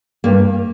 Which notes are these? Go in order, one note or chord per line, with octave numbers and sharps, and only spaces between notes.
G2 A#3